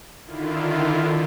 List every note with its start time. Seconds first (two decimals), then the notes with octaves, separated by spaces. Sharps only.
0.25 D3 D#3 E4 F4